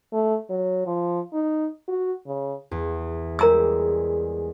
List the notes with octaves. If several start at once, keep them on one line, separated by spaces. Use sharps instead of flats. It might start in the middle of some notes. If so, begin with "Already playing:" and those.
A3
F#3
F3
D#4
F#4
C#3
E2
G3 G#3 A#4 A#5 E6